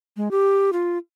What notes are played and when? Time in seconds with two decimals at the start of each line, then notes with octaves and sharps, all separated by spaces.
0.17 G#3
0.31 G4
0.73 F4